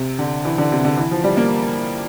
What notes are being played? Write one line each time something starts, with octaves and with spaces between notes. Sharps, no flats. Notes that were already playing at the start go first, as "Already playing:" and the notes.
Already playing: C3
D3
E3
D3
C3
D3
E3
F3
G3
A#3